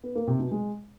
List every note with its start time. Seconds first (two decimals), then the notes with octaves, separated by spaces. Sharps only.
0.03 B3
0.15 A#3
0.27 C3
0.39 B2
0.51 G#3